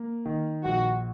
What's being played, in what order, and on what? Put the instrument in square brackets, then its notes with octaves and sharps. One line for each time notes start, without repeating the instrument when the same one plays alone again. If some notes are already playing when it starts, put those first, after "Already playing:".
Already playing: [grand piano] A#3
D#3
[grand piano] A#1 [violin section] F#4